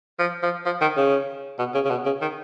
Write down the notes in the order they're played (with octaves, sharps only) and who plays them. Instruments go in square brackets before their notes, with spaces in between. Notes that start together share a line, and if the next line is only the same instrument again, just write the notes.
[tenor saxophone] F3
F3
F3
D#3
C#3
B2
C#3
C#3
B2
C#3
D#3